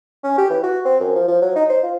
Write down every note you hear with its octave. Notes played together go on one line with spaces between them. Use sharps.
C#4
G4
E3
F#4
C4
F#2
F3
F3
F#3
D#4
C5
F4